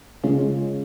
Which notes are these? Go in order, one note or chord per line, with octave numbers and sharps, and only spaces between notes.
C#3 G#3 C#4 F4